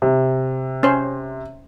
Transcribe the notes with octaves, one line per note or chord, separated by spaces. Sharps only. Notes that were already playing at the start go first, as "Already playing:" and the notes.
C3
C#4 C5